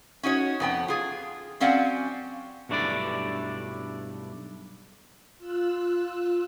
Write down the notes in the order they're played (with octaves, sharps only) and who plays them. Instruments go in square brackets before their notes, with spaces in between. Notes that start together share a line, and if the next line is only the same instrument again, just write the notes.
[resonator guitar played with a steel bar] C#4 D#4 F#4 C#5
F2 B3 G5
F4 G#4
F#3 C4 C#4 D5 F5 F#5
[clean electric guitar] B1 G2 A3 D4 E4 D5
[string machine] F4 E6 F#6